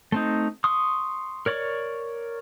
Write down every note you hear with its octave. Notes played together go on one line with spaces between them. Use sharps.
A3 C4 D#4
C6 C#6 D#6
A#4 C#5 D5 C#6